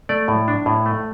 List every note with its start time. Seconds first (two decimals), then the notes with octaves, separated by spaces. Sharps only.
0.09 A3 D5
0.28 A2
0.48 D4
0.66 A2
0.86 A3